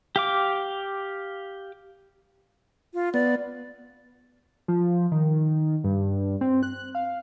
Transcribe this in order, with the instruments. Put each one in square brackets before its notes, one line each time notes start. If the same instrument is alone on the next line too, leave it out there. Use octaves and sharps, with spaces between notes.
[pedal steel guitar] G4 F5 D6
[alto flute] F4
[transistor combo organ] B3 [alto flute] D5
[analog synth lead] F3
D#3
G2
C4
F#6
F5